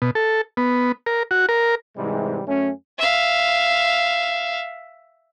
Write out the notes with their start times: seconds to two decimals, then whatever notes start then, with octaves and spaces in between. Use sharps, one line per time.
0.02 B2
0.15 A4
0.57 B3
1.06 A#4
1.31 F#4
1.49 A#4
1.97 G#2 C3 E3 G3 G#3
2.47 F#2 A3 C#4
2.99 E5 F5